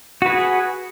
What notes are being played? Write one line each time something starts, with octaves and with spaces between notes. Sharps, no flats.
F#4 G#4 B4